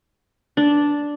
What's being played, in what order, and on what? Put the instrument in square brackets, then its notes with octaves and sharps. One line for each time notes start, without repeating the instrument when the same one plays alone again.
[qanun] D4